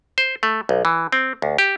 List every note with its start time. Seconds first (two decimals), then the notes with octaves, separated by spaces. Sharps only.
0.18 C5
0.43 A3
0.69 B1
0.85 E3
1.12 C4
1.42 D2
1.58 G4